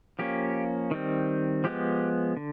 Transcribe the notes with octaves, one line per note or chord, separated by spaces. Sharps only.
F3 A#3 C#4 G4
D#3 G3 C4
F3 G#3 B3 G4
D3